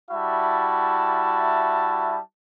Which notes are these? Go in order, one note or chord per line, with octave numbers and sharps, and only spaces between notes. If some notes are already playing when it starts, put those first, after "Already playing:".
G3 E4 F#4 E5 A5